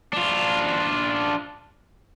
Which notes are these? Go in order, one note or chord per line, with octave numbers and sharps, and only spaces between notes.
D4 F4